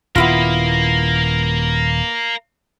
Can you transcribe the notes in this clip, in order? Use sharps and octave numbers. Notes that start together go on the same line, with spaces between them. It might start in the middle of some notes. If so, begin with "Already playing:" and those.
D#1 B3 E4 F4 A#4 F5